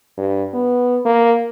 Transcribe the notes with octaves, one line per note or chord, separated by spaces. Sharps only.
G2
B3
A#3